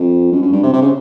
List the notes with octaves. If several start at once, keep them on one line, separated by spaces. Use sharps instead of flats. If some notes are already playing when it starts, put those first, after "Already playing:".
Already playing: F2
F#2
F#2
G2
C3
C3
C#3